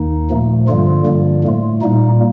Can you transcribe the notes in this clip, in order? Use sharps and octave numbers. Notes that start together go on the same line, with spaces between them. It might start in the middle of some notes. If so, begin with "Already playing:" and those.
Already playing: D#2 D#3 A#3 D#4
A#2 F3 A3
G2 D3 F3 G3 A#3 F4
G2 D3 G3 A#3
A2 A3
A#2 G3 A#3 D#4